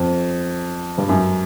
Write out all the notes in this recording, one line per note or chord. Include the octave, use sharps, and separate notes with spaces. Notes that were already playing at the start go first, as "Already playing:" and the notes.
Already playing: F2
G2
F#2